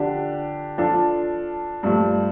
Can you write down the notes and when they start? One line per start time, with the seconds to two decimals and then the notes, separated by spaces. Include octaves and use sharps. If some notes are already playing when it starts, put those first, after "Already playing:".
Already playing: D3 F3 D4 G4
0.78 F3 D4 F4 A4
1.83 G2 F3 A3